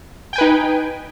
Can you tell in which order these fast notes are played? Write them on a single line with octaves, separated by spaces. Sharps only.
G5 G#5 B4 D#4